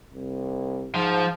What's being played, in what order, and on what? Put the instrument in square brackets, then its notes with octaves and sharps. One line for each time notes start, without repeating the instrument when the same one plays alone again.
[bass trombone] C2
[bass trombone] G#2 [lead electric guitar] F3